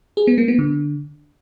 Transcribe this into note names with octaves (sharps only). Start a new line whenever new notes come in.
G#4
B3
A#3
B3
D3